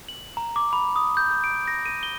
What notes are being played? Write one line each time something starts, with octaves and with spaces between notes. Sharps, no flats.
F#7
A#5
D6
B5
D#6
G6
G6
D7
A#6
D#7
G7